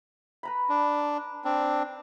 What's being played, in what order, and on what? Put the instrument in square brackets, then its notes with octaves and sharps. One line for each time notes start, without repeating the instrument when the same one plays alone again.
[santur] B4 A#5 B5
[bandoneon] D4
C4 D4